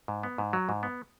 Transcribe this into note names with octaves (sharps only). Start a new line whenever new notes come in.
G#2
B3
G#2
F#3
G#2
B3